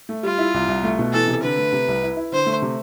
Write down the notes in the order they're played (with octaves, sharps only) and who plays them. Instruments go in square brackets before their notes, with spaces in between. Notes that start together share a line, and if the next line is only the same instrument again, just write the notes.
[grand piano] A3
[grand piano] G3 [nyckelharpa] F4
[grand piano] E4
C2
C2
A3
B2
[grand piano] E3 [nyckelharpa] A4
[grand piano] C3
[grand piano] D3 [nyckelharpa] B4
[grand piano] A3
C3
C2
E4
E4
[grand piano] D3 [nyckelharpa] C5
[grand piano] A3
C3